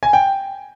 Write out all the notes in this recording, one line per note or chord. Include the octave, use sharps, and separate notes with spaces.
G#5
G5